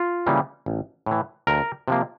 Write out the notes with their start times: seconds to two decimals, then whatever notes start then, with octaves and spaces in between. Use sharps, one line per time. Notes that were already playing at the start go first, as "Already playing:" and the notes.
Already playing: F4
0.26 C#3 E3 G3 A#3
0.66 A1
1.06 A2 E3
1.47 D2 A#4
1.88 C3 F3 A#3